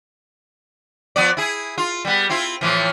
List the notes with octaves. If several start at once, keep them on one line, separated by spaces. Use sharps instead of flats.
F3 B3 D5
E4 G#4
F4
G3 B3
C4 E4 F4
A2 E3 F3